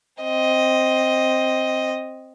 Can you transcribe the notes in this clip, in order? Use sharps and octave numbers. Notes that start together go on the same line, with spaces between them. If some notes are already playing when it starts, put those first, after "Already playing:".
C4 D#5